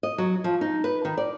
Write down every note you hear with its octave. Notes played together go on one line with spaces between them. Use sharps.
D#5
F#3
F3
D#4
B4
D#3
D5